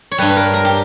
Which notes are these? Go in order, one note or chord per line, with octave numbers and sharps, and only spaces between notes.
C#5
G2 G3 B4
B4
A#4
A#4
G4